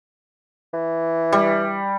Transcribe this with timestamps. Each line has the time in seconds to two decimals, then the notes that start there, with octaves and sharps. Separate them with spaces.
0.73 E3
1.33 G3